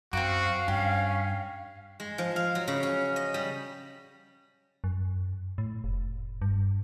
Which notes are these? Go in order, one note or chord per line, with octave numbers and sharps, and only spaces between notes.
F#2 C4 F#4 F5 D6
G2 C#4 G4
G#3
F3
F5
F#3
C#3
C#4
D#5
G3
F#2
A2
F1
G2